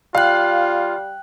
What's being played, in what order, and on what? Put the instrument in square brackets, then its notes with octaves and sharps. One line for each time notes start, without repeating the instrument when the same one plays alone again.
[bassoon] G3 [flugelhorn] F4 [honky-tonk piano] F5 [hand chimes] G5 F#6